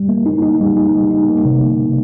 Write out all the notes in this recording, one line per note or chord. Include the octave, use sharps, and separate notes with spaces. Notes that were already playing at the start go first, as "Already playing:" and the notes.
Already playing: G3
A#3
D#4
D#4
G3
D#4
G3
D#4
A#3
C3